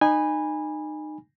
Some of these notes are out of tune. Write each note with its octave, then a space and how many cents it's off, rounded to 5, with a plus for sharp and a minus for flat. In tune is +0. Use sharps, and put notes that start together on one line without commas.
D#4 -30 G#5 -15 B5 -10